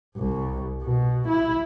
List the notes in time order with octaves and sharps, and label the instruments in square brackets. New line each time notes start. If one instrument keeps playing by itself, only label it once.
[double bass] C2
B2
E4